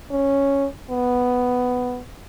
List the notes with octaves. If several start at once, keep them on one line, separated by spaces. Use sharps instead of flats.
C#4
B3